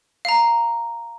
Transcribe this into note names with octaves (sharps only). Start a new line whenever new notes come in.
F5 A#5